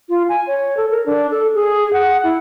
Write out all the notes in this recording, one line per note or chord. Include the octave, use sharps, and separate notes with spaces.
F4
G#5
C#5
A4
A#4
D4
A4
G#4
F#5
E4